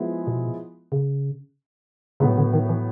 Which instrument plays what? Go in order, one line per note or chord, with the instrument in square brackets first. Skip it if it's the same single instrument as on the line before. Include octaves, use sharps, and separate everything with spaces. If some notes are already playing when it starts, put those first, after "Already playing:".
Already playing: [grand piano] F3 G#3 B3 E4
[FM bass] B2
C#3
[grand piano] A2 F#3 B3 [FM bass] C#3
[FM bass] D3
D#3
E3